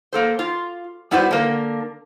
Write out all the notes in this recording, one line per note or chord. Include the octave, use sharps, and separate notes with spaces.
A#3 A4 C5
F4
G3 B3 E4 F#4 B4 C5
D3 A#3 A#4